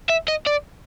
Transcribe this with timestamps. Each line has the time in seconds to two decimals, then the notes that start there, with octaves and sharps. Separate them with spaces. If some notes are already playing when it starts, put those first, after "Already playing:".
0.09 E5
0.28 D#5
0.47 D5